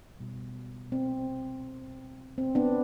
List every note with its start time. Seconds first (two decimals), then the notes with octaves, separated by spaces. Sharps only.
0.20 B2 G3
0.92 C4
2.38 C4
2.55 B3 D4